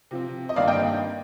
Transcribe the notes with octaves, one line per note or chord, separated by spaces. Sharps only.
C3 F3 C4
D#5
G2 D#3 A#3 D4 D5 F5
D#5 G5